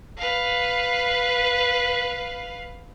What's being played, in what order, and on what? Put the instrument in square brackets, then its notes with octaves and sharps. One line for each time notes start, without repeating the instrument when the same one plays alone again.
[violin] B4 F5